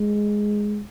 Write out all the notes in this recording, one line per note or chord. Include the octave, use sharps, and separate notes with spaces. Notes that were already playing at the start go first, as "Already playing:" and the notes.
Already playing: G#3